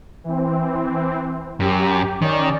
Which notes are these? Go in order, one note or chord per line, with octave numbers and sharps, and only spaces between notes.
E3 C4
F#2 G4
D#3 C#4 D5